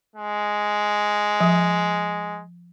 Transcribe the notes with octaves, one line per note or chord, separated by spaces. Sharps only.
G#3
F3